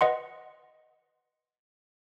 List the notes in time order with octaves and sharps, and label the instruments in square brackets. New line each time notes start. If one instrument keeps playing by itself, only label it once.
[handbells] B4 D#5 F#5 C6